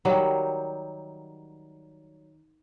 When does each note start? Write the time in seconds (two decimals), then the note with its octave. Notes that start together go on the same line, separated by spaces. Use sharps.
0.05 D#3 F#3 G3